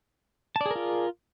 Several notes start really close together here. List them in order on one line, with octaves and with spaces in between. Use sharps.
A5 D5 G#4 A#4 F4